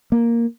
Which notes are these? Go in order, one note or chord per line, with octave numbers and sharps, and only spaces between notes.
A#3